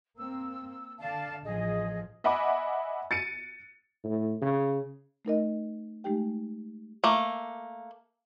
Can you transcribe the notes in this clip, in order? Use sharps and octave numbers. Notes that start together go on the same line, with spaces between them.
A#3 C4 E6
D3 D5 F5 A5
A1 F3 G#4 D#5
D#5 E5 F#5 G#5 B5 D6
A6 C#7 D#7
A2
C#3
A3 D#4 A#4 D#5
G#3 A3 D#4 G4 G5
A3 A#3